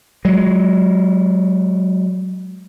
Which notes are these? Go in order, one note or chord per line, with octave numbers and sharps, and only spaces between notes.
F#3 G#3